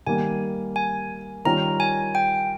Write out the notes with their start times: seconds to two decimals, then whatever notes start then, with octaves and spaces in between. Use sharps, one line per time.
0.07 D#3 G3 A#3 G#5
0.76 G#5
1.45 D#3 G3 C#4 F4 A#4 A#5
1.80 G#5
2.15 G5